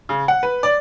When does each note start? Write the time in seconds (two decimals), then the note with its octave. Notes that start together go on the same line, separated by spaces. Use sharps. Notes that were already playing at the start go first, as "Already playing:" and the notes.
0.09 C#3
0.28 F#5
0.43 B4
0.63 D5